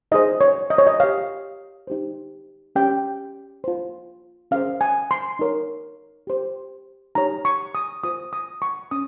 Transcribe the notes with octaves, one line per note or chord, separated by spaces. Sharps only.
D#4 G#4 C5 D#5
C#5
D#5
C#5
D#5
G4 C#5 F5
D#4 G4 C5
C#4 G4 C#5 G5
F4 C5
C#4 G#4 C5 F5
G#5
C6
D#4 A#4 C#5
G4 C5
D#4 G4 C#5 A#5
C#6
D#6
F4 C5 D#6
D#6
C#6
C#4 D#6